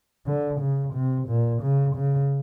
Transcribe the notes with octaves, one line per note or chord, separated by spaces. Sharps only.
D3
C#3
C3
A#2
C#3
C#3